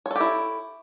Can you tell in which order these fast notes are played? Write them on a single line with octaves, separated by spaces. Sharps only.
C#5 A4 G4 E4